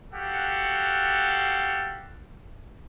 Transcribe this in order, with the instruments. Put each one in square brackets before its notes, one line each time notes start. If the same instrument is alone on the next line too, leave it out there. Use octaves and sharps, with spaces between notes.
[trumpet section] F#4 G4 A4 F5 F#5